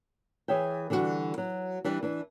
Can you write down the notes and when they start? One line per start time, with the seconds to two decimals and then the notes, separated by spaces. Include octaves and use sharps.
0.48 E3 G#4 C#5 E5 G5
0.90 D3 E3 G3 F#4
1.38 F#3
1.85 E3 G3 D4
2.03 E3 D4